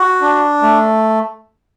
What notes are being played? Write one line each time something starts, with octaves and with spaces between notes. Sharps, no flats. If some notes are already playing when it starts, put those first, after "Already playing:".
Already playing: F#4
D4
A3